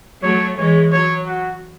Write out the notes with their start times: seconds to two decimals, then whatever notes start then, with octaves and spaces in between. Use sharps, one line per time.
0.23 F#3 A3 C#5
0.57 E3 G#3 C#5
0.92 F#3 C#5
1.26 F#4